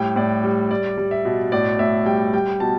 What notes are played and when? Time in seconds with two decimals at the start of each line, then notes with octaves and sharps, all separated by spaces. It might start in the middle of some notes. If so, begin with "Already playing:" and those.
Already playing: A2 G3 G5
0.16 A2 D5
0.44 G3
0.71 G3 D5
0.98 G3
1.11 E5
1.25 B2
1.52 A2 D5
1.79 A2 E5
2.06 G3 G5
2.33 G3 G5
2.60 B2 A5